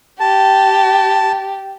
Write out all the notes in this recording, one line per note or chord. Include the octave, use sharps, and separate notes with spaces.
G4 A5